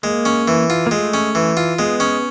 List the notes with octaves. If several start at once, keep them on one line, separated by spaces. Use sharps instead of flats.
G#3 A#3
C#4
E3
F4
A#3
G#3 A3
C#4
E3
F4
G#3 B3
C#4